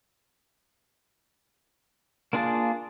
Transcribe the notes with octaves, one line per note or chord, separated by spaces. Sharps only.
A#3 D4 F4 G#4 A5